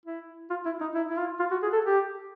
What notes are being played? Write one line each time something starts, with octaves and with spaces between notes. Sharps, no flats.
E4
F4
E4
D#4
E4
E4
F4
F4
F#4
G#4
A4
G4